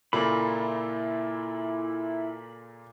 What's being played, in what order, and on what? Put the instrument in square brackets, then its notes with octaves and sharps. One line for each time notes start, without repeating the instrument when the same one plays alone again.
[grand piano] A#2 C#3 [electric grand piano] A#3 F4 A4 [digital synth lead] E4 [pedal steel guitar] B5